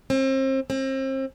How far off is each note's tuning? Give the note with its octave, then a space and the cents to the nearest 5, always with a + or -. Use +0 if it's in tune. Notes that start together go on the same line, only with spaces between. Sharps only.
C4 +35
C4 +35